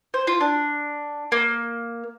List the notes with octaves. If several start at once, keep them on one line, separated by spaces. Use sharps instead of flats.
C5
F4
D4
A#3